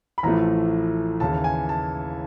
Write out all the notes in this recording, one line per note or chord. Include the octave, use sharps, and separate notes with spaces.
B5
A1 A2 F3 A3 A#5
D#2 C#3 E3 A5
G#5
A5